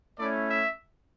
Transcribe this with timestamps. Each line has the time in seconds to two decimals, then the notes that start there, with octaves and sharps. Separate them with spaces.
0.19 A3 C#4 E4 D5
0.50 E5